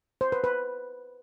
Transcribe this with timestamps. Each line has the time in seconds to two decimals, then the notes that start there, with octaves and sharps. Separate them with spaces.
0.21 C5
0.32 B4
0.44 B4